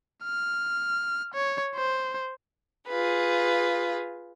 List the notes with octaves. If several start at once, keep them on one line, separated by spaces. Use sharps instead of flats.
F6
C#5
C5
F4 G#4 B4